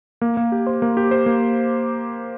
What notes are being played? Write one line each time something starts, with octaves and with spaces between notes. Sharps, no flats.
A#3
A#3
G4
C5
A#3
G4
C5
A#3